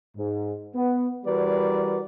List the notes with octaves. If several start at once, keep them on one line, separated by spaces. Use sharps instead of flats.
G#2
B3
E3 G3 F#4 A#4 B4 D5